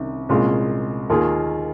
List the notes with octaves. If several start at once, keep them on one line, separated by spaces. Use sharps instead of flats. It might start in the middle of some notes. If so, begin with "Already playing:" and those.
Already playing: C2 C3 D#3 C#4
C2 A#2 G#3 C#4 F4
D#2 D#3 A#3 F4 G#4